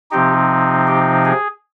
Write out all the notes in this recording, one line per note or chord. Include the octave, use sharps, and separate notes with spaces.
C3 F3 C4 D#4 G4
G4
G#4